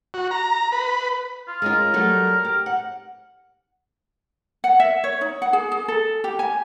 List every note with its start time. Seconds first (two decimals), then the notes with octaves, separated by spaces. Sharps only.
0.14 F#4
0.31 A#5
0.72 B4
1.48 F4
1.62 G#3 C#4 F4 A#4
1.94 F#3 G3 A3
2.45 G4
2.66 F#5
4.64 F#5
4.80 E5
5.04 C#5
5.21 D#4
5.42 F#5
5.53 G#4
5.72 G#4
5.88 A4
6.24 G4
6.39 G#5